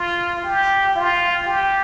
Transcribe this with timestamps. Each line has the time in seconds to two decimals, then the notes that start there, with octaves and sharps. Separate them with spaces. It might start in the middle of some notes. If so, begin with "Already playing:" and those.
Already playing: F4
0.44 G4
0.95 F4
1.46 G4